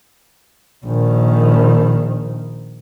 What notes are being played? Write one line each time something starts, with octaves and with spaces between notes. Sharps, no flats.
A#1 D#3